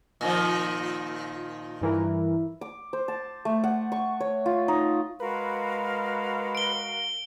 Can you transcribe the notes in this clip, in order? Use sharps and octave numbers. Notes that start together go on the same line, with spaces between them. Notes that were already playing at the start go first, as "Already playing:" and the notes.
A#2 D#3 F3
G2 E3 E4 A#4
D6
C5
A5
A3
F#5
C#6
C#5
F4
D#4
G#3 F#4 A#4 B4 F5
D7 G7